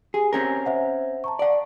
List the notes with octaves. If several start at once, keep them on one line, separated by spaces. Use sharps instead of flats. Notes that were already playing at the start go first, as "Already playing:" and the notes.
G4 G#4
C4 C#4 A#4
C5 E5 F#5
A5 A#5 C#6
D5 F#5